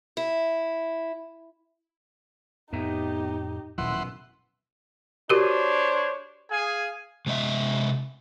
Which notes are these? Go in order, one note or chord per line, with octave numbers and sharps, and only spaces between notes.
E4
F2 A2 B3 D#4 G4 E5 A#5
D#1 F#2 B2 F3 B3 E4 F#5 C6
D4 F#4 G4 A#4 C5 C#5
G#4 F5 G#5
C3 G#3 D#5 E5